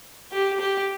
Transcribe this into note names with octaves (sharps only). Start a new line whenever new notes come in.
G4
G4